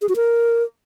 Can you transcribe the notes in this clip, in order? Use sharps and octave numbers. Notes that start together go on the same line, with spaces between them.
G#4
F#4
A#4